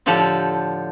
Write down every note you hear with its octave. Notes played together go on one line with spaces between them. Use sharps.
A2 D3 F3 G4 A4